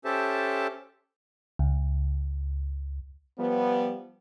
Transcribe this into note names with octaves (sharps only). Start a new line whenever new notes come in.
C#4 G4 A4 C5 E5 A5
C#2
F3 G3 B3